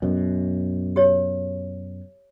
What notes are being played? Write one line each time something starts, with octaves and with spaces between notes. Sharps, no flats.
F#2 B2
G4 C#5